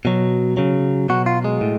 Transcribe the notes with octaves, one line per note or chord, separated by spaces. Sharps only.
B2 F#3
C#3 F#3
B2 F#3 F#4
F4
G#3
A2